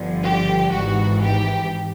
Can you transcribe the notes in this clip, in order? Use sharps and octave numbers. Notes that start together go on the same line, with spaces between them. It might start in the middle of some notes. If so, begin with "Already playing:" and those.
Already playing: G1 G2 D3 F3
G4
G#1 G#2 E3 F#4
G4